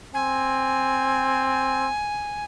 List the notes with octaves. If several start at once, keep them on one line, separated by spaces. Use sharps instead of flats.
C4 G#5